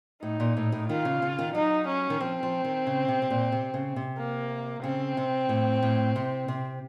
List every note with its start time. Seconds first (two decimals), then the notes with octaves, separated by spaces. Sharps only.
0.23 A2 D#4
0.40 A#2
0.57 A2
0.72 A2
0.89 D#3 F4
1.05 C#3
1.22 C#3
1.39 D#3
1.54 F#3 D#4
1.88 C#4
2.10 D#3
2.20 F3 C4
2.43 F3
2.65 D#3
2.87 C#3
3.08 C3
3.22 C3
3.30 A#2
3.52 C3
3.74 C#3
3.96 C3
4.18 A#3
4.83 C#3 C4
5.17 C3
5.49 A2
5.82 A2
6.16 C3
6.48 C3